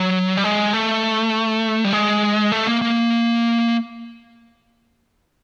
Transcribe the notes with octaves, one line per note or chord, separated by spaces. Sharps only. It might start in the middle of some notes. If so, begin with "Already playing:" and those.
Already playing: F#3
G3
G#3
A3
G3
G#3
A3
A#3
A#3